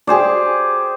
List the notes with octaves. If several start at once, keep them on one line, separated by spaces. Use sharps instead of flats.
G4 G#4 C5 D5